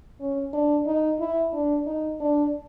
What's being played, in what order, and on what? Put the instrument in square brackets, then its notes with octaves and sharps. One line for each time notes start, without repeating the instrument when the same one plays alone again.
[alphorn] C#4
D4
D#4
E4
D4
D#4
D4